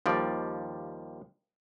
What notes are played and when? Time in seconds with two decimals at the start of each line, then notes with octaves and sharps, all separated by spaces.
0.06 D#2 F3 G3 D5